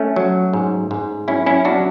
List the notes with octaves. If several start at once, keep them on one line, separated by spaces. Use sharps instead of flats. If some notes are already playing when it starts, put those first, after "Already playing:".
Already playing: A3 C#4
F#3
G#2
G#2
F#3 C#4 E4
C#4 E4
F#3 D4 F#4